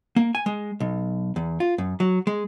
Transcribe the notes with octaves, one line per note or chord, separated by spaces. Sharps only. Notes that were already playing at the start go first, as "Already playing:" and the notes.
A#3
G#5
G#3
B1
E2
F4
F#2
F#3
G#3